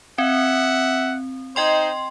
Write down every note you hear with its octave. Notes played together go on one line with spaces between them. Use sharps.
C4 E5 F#5
D#4 C5 D#5 G5 C6